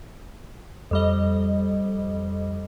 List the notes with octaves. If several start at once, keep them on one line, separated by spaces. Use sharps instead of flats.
F2 G3 D#5